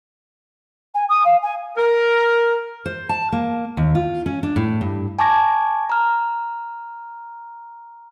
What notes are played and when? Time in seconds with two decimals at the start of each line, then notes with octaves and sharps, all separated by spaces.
0.94 G#5
1.09 D#6
1.24 F5
1.42 G#5
1.77 A#4
2.86 C5
3.09 A5
3.32 A#3
3.77 D#2
3.95 F4
4.26 C#4
4.43 D4
4.56 A2
4.81 G2
5.19 G#5 A5 C#6 D6 G#6 A#6
5.90 A#5 F6